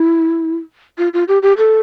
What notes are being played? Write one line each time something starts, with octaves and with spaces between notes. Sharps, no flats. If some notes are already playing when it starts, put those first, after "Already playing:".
Already playing: E4
F4
F4
G4
G4
A4